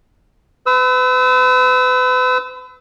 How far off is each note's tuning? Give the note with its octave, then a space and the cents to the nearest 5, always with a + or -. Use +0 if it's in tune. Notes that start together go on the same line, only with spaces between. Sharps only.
B4 +40 E6 -25